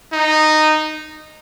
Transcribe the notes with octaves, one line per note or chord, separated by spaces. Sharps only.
D#4